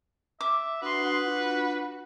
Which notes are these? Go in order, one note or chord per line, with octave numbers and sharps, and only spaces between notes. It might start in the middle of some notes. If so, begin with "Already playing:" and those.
E5 D6
D4 F#4 B4 C6 D#6
D4 F4 F#4